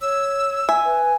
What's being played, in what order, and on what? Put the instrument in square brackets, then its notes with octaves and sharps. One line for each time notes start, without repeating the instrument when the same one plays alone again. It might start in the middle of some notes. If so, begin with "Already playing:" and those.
[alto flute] C#5 [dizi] E6
[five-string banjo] E5 [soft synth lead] G#5
[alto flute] B4